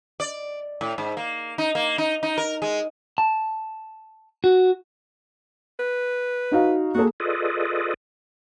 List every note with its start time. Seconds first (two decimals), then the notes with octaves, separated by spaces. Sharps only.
0.20 D5
0.81 A2
0.98 G#2
1.17 A#3
1.58 D#4
1.75 A#3
1.98 D#4
2.23 D#4
2.38 A#4
2.62 G#3
3.18 A5
4.44 F#4
5.79 B4
6.52 D#4 F#4 F5
6.95 A#3 F#4 G#4 A4
7.20 F4 G#4 A4 B4 D5 D#5